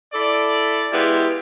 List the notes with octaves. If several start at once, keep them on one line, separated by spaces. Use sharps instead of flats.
E4 A4 D5
G#3 B3 E4 F4 G4